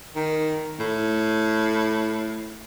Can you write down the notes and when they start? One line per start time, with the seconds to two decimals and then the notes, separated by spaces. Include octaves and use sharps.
0.16 D#3
0.79 A2